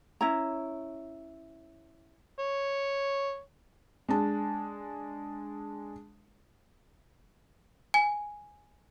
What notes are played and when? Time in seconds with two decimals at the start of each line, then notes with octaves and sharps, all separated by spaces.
0.21 C#4 E4 A#5
2.39 C#5
4.09 G#3 D4 A5
7.94 G#5